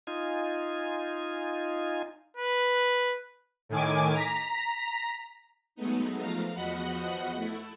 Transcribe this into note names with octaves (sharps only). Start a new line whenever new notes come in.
D#4 F4 G#5
B4
A2 D#3 G#5 D6
A#5 B6
F#3 G#3 A3 B3 D#4
F3 A3 F5 A#5
E2 F3 F#4 D#5 F#5 B5
A3 E4